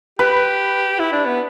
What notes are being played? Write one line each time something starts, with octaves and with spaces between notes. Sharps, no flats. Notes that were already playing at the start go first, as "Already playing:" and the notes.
G4 B4
E4
D4
B3